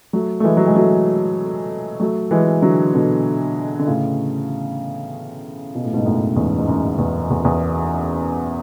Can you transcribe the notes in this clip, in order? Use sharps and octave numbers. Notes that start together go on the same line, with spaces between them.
F#3 A3
A3
E3 G#3
F#3
G#3
F#3 A3
F#3 A3
E3 G#3
D3 F#3
B2 D3
D3
A2 C#3
B2
A2
G#2 B2
F#2 A2
E2 G#2
G#2
F#2
E2
E2
E2